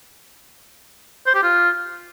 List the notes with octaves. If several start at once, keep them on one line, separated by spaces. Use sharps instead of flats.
C5
G4
F4